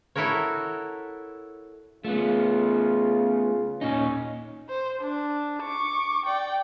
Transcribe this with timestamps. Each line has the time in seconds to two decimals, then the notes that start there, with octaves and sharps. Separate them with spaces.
0.15 E4 F#4 A4 A#4 C#5
2.04 C#3 A3 B3 F4
3.81 A#2 C#4 D#4
4.69 C5
5.02 D4
5.62 C#6 D6
6.25 D5 G5